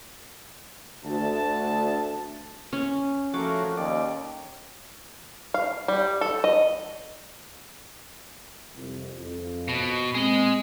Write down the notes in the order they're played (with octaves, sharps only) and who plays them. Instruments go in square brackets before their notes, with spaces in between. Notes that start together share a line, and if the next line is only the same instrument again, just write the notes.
[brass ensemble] D2 A5
[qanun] C#4
[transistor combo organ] F3 C#4 F#4 [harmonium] A3 A4 A#4 [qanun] D6
[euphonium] D#2 [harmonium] C#4 [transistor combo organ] D5
[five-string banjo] F5
G3
A4
D#5
[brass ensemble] C2 F2
F2
[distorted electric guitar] B2
[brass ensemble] A#2 G#3 C4 [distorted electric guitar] G#4 D#5